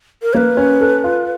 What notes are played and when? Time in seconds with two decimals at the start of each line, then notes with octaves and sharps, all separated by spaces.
0.22 A#4
0.33 A#3 B4 C#5
0.57 C#4
0.81 A4
1.04 F4